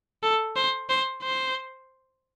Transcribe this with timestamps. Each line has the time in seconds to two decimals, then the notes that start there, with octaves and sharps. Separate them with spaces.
0.23 A4
0.56 C5
0.89 C5
1.23 C5